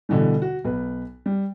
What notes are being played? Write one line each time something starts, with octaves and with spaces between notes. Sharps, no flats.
B2 D3 E3 G3
F#4
B1 B4
G3